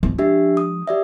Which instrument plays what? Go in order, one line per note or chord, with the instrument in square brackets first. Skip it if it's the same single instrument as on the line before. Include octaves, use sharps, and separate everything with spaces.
[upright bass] F3 G#3
[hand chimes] D4 G4 E5
D#6
G4 D5 E5